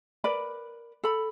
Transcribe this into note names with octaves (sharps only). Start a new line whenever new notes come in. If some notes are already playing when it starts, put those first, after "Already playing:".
A#4 B4 D5 B5
A4 B5